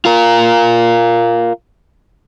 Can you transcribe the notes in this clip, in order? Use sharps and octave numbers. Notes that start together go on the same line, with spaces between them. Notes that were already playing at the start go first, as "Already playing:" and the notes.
F4 A#4